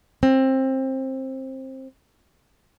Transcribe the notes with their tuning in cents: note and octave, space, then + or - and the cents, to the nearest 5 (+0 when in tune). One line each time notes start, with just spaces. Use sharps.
C4 +20